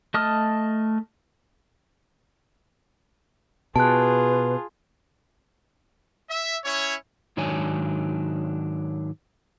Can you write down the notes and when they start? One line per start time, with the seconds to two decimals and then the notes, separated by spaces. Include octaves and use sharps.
0.14 A3 D#5 A5 D#6 F6
3.76 B2 F4 G#4 B4 A5 F#6
6.30 E5
6.65 C#4 E4 C#5
7.37 G#2 D#3 F#3 D4 C#5 G#5